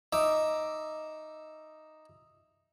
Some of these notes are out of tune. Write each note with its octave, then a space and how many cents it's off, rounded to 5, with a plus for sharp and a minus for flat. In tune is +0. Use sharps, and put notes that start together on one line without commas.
D#4 +0 E5 +0 D6 +0